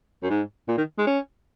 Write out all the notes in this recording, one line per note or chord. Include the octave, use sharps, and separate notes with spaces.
F#2
G#2
A#2
D#3
G#3
C#4